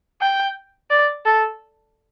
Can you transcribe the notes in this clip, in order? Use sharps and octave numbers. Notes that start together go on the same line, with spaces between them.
G5
D5
A4